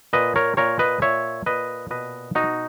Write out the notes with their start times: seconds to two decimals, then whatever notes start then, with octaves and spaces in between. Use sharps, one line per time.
0.13 A#2 B4 D#5
0.36 A#4 C#5
0.57 A#2 A#4 C#5
0.79 B4 D#5
1.02 A#2 C#5 E5
1.46 A#2 B4 D#5
1.91 B2 B4 D#5
2.35 B2 D#4 F#4